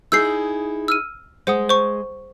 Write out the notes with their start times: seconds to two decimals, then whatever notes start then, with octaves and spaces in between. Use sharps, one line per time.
0.12 D#4 E4 G#4 E6 G6 C7
0.88 E6 F6 D#7
1.47 G#3 C5 F#5 D#6
1.69 C5 C#6